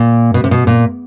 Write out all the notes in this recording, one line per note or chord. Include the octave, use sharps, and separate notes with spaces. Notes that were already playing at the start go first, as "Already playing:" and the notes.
Already playing: A#2
B2
C3
B2
A#2